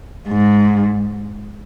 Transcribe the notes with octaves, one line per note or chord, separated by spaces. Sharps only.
G#2